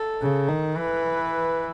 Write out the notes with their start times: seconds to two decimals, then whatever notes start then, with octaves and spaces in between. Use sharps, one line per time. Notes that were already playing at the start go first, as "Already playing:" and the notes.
Already playing: A4
0.21 C#3
0.49 D#3
0.76 E3 B4